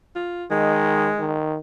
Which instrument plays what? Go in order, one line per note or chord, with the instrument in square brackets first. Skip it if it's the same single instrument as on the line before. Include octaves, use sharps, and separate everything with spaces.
[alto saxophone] F4
[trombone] D#3 [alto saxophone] G#3
[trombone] D#3